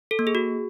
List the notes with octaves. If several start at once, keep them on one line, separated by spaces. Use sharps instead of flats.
A4
A#3
G#4
F#4